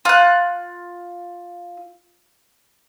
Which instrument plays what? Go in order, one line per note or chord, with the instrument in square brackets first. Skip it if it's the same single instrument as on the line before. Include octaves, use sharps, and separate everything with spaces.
[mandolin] F4 F#6